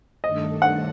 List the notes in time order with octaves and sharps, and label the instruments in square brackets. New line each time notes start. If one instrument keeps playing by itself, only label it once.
[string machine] G2 D#3 A3 D4 A4 [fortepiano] D#5
[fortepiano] F#5